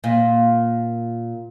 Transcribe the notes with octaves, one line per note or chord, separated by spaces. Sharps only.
A#2